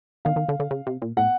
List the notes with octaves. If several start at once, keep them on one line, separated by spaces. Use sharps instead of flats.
D#3 F5
D#3
D3
D3
C#3
C3
A#2
A2 F#5